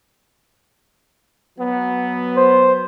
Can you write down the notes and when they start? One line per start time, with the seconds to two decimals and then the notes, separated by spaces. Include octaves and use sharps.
1.59 F#3 B3
2.37 C5